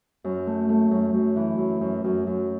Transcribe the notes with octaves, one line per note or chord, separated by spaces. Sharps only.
F#2
A3
A3
F#2
F#2
E3
F#2
F#2
F#2
F#2